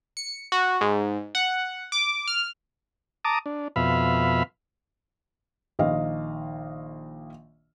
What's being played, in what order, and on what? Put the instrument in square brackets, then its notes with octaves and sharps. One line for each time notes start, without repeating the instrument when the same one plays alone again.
[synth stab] C#7
F#4
G#2
F#5
D6
F6
[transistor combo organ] A5 A#5 D6 D#6
D4
F2 B2 E5 F5 B5
[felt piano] A#1 D#3 D#5 F5